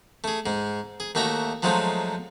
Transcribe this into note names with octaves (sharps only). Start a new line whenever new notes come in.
A3 G#4
G#2 G#3
G#4
D#2 A3 F#4 E5 A#5
F3 F#3 G#3 A3 C4 D#4